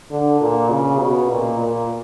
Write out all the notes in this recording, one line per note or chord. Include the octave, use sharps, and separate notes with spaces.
D3
A#2
C#3
B2
A#2
A#2